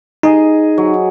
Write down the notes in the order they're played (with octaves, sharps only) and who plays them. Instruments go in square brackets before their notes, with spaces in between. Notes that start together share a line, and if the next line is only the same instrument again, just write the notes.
[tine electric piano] D#4 [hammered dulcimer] G#4 D#5
[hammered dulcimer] F#3